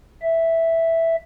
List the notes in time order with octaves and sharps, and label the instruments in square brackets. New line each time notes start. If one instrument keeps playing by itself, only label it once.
[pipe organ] E5